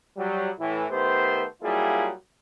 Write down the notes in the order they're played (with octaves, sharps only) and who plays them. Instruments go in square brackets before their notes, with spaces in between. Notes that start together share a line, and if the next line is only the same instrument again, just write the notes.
[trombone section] F#3 G3
A2 E3
D#3 A3 B3 G4 C5
F#3 G3 A#3 E4 F4 G#4